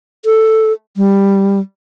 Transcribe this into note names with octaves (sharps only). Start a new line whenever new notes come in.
A4
G3